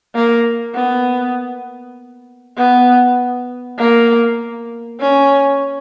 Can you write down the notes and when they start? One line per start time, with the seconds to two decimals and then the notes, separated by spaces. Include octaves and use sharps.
0.15 A#3
0.74 B3
2.57 B3
3.79 A#3
5.00 C#4